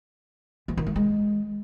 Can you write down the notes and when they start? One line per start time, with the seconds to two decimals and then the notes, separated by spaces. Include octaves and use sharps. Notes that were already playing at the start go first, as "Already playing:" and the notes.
0.68 E3
0.77 D#3
0.87 A3
0.96 G#3